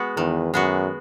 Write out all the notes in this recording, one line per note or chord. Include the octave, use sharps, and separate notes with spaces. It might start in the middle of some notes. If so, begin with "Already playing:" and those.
Already playing: G#3 B3 F#4
E2 D#3
F#2 G#3 B3 F#4